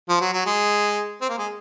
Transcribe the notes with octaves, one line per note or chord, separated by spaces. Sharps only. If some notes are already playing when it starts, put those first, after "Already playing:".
F3
F#3
F#3
G#3
C4
A#3
G#3